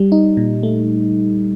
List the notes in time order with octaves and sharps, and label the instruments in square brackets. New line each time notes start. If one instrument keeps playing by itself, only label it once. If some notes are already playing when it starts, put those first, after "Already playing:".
Already playing: [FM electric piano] G3
D#4
A#2
A3